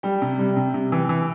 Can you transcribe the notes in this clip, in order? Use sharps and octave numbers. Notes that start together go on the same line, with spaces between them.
G3 G5
C3
G3
C3
C3
E3
E3